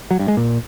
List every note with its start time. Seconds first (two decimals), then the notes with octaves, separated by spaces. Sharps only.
0.11 F#3
0.19 G2
0.28 G#3
0.37 A#2